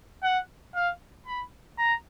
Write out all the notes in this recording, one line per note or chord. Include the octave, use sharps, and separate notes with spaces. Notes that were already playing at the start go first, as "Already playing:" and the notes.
F#5
F5
B5
A#5